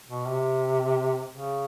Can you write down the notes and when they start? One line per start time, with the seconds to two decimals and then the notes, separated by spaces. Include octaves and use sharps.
0.08 B2
0.26 C3
1.31 C#3